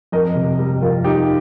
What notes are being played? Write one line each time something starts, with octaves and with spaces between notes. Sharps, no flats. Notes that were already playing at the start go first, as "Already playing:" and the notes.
F2 A#4 D#5
C3
G3
F2 F4 A#4
G3 D#4 G4